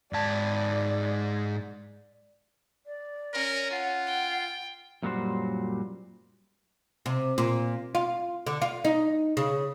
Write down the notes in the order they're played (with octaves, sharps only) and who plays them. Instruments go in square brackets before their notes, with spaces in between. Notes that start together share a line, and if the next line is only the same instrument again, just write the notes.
[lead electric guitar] G#2 A5 [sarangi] D5
[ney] D5
[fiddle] C#4 [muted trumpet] A#4
[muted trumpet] F4 [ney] F#5
[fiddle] G5
[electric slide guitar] F#2 A#2 F#3 G3 F#4 C5
[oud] C3
A#2
F4
D3
F4
D#4
C#3